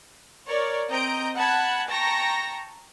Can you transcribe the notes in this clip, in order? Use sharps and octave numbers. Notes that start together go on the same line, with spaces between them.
A#4 C#5 D5
C4 D#5 A#5 G6 D7
F#5 A5 B5 F#6 G#6
G5 A5 A#5 C#6 A#6